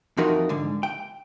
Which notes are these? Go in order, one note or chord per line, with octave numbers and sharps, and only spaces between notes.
F2 E3 F3 D#4 F#4 A#4
G#2 D3
G5